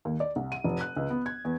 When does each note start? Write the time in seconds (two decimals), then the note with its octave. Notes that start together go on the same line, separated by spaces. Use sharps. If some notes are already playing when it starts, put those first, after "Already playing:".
0.05 D#2
0.20 D5
0.36 C2
0.52 D#7
0.64 F1
0.81 F#6
0.96 C#2
1.10 B3
1.26 G#6
1.45 E2